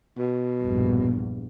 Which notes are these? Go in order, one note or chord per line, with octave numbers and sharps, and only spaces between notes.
B2
A#1 E2 G2